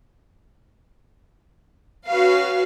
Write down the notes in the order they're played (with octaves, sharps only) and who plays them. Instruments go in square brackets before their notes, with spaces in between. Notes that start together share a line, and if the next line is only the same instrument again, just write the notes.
[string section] C#4 F#4 B4 F5